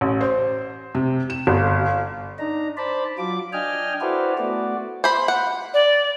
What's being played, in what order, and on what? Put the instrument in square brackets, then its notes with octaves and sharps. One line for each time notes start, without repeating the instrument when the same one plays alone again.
[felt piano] A1
C5
C3
E7
G1
[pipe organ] D4 D#4 A#5
C5 D5 A5 B5
F#3 F4 D6
D4 D#5 G5 G#5 F6
E4 F#4 A4 B4 C5 D5
A3 B3 F#4 D5
[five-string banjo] C5 B5
F#5
[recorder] D5